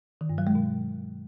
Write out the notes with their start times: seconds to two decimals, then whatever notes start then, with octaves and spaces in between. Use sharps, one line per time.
0.21 D#3
0.30 G2
0.38 F#3
0.47 G#3
0.55 B2